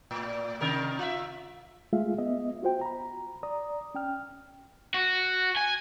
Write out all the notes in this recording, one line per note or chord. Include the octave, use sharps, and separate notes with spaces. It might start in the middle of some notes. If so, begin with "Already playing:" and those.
A2
C3 D#3 A#4
F4 E5
G#3 A3 F4 G#4 E5 F5
B3 D#5 E5
F4 F#4 C5 G5
A#5 B5
D5 A#5 D#6
C#4 G5 F6
F#4
G#5